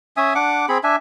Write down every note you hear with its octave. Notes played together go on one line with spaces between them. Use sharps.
C#4 E5 G#5 D#6
D4 F#5 D6
C4 G#4 B5
D4 E5 G#5